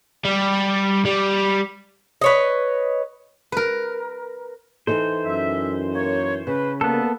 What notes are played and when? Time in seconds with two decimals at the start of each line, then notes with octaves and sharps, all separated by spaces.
0.25 G3
1.05 G3
2.21 B4 C#5 D#5
3.52 A#4 B4
4.87 E3 D#4 A4 C5
5.25 F#2 E5
5.93 A#3 C#5
6.47 C#3 B4
6.81 C2 A#3 B3 A4 A5